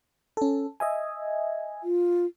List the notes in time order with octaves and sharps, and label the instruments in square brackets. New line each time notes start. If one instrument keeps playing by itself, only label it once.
[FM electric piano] C#4 A4
D#5 E5 G#5
[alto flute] F4